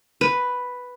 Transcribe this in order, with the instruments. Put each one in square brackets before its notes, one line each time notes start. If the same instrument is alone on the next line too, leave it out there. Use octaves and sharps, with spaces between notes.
[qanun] B4